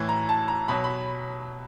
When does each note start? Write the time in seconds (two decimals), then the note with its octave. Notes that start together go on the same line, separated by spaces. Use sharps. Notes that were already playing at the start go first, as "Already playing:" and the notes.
Already playing: A2 E3
0.09 A#5
0.29 A5
0.48 A#5
0.68 B2 F#3 B5
0.84 B5